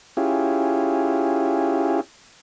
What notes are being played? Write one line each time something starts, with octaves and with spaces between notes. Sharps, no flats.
C#4 E4 F4 G4 G#4